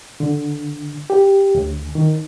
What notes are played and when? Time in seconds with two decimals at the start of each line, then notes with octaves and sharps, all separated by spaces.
0.20 D3
1.10 G4
1.55 D2
1.95 D#3